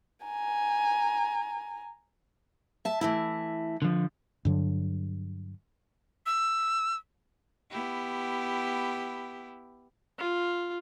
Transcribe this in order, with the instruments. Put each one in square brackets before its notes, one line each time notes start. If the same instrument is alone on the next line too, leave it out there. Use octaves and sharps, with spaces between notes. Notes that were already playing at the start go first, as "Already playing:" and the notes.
[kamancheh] G#5 A#5
[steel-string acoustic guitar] E5 A5
E3 A3 E4
[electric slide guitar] D3 F3
[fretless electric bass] G2 D3 F#3
[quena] E6
[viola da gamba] B3 E4 G4
[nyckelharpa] F4